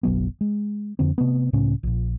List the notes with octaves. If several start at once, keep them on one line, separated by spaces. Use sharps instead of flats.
F#1 B1 F#3 B3
G#3
F2 D3 C4
C3 A3 B3
C#2 A2 C#3 C#4
A#1 A#2